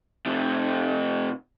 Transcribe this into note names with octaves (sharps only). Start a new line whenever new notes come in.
F2 C3